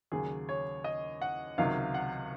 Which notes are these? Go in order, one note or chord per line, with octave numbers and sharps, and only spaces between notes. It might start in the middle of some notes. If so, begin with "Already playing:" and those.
D#2 C#3 F#3 G#4
C#5
D#5
F#5
C#2 C3 D#3 F#3 F5
F#5